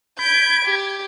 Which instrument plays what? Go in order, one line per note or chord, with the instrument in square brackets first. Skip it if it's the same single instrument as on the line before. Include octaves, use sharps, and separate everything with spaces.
[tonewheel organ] B5 G#6 [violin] G6 D7
[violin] G4